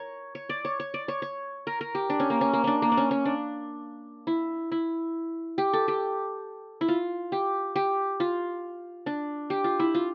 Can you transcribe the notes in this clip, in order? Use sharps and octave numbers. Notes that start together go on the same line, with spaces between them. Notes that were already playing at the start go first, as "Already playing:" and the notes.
Already playing: A#4 C#5
C#5
D5
C#5
C#5
D5
C#5
C#5
A#4
A#4
G4
D4
C#4
A#3
C#4
A#3
C#4 D4
A#3
D4
C#4
C#4
D4
E4
E4
G4
A4
G4
E4
F4
G4
G4
F4
D4
G4
F4
E4
F4